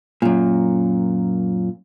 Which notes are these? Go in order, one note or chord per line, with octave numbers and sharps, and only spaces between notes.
F#2 A#2